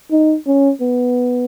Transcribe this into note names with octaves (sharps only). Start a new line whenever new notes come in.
D#4
C#4
B3